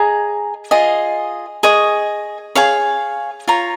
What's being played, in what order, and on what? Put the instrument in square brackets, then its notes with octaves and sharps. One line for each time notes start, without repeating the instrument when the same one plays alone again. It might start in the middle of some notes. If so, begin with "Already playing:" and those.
Already playing: [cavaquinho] G#4 D#5 A#5
F4 G#4 D#5
G#4 D#5 C#6
G#4 C#5 F5
F4 C#5 A#5